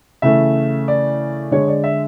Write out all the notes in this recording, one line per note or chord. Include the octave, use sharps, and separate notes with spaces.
C#3 E3 A3 E5
D5
D3 G#3 C#5
D5
E5